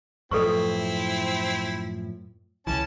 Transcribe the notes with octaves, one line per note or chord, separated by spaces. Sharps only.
F#2 A2 F3 C4 E4 A4 B4 C#6
C#2 E3 C#4 A5